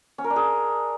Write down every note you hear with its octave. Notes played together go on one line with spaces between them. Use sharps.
C#4
A#4
D4
G#4